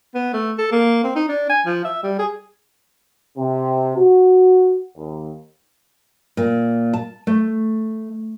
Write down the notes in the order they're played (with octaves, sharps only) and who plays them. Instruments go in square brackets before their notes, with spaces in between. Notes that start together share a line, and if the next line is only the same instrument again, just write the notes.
[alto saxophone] B3
A3
A4
A#3
C4
D#4
D4
G#5
F3
E5
G3
G#4
[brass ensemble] C3
F#4
D#2
[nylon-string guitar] A#2
A5
A3